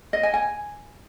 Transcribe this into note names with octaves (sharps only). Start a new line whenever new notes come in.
D#5
G#5
G#5